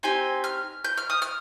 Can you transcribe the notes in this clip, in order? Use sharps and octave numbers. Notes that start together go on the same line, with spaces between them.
C4 D#4 G4 G#5
F6
G6
F6
D#6
F6